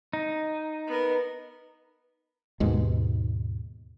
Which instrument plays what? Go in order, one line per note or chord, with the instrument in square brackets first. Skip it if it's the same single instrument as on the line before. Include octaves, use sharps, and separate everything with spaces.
[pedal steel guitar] D#4
[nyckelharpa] B3 A#4
[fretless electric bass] D#2 G#2 B2 G#3